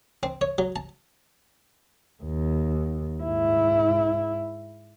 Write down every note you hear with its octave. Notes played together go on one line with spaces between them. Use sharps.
C4
C#5
F#3
A5
D#2
G#2 E4